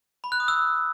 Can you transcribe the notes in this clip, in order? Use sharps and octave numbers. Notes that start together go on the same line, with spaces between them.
B5
F#6
D#6
E6